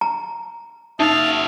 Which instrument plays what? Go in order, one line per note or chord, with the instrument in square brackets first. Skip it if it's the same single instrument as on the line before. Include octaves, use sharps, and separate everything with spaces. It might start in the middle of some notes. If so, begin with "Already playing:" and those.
[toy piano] A#5
[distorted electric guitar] F#2 F5 [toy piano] D#4 [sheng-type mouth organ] E5 A5 D#6